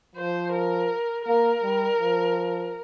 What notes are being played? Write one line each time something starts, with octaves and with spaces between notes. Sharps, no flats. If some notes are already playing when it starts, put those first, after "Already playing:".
F3 C5
A#4
A#3 A#4
G3
F3